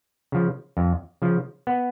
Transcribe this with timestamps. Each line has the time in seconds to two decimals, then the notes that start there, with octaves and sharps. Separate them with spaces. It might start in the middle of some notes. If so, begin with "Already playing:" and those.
0.32 C#3 F3
0.77 F2
1.22 C#3 F3
1.67 B3